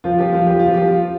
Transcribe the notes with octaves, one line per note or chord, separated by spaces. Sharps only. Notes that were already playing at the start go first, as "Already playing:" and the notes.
F3 F4
F3 G4
F3 F4
F3 G4
F4
F3
G4
F3
F4